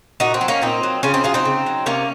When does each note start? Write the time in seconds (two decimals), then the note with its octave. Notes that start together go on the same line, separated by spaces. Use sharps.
0.20 A#2 D#4 F#4
0.34 C4
0.41 F#3
0.48 A#3 C#4
0.62 A#2 C4 D#4
0.83 F#3
1.03 C#3 C#4 F4
1.14 C4 D#4
1.24 F#3 F4 G#4
1.34 C4 D#4
1.45 C#3
1.66 F#3
1.86 C3 A#3 C#4